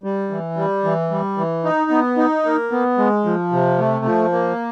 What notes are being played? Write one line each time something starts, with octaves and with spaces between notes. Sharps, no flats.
G3
E3
G3
E3
G3
E3
D#4
B3
D#4
A#3
B3
G#3
F3
C3
A3
F3
A#3